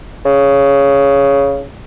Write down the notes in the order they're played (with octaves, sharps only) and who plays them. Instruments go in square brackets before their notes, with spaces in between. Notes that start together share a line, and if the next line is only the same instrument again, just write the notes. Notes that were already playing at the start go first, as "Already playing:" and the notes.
[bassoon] C#3